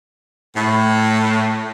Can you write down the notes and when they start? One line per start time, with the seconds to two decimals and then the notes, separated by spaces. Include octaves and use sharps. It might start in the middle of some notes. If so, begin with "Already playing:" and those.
0.56 A2